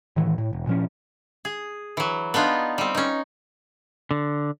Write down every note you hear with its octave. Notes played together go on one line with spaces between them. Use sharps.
A2 D#3 E3
A2
E1
A#2 F3 C#4
G#4
E3 F#3
B3 D4 D#4 F4
G3 C4
C#4 D#4
D3